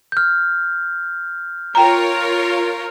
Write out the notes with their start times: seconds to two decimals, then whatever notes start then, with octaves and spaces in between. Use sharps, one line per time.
0.12 F6 G6
1.75 F4 A#4 C#5 G5 A#5